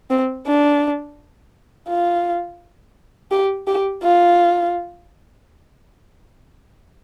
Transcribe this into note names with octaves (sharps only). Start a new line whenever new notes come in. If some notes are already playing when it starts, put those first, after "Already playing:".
C4
D4
F4
G4
G4
F4